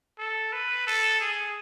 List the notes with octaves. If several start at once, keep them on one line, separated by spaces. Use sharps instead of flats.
A4
B4
A4
G#4